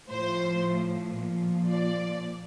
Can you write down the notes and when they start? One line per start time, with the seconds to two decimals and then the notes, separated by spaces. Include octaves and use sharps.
0.10 A2 F3 C5
1.16 A#2 F3
1.70 D5